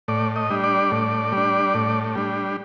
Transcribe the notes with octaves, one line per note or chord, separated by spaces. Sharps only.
A2 D5
D#5
G3 D4
D5
A2
G3 D4
A2
G3 D4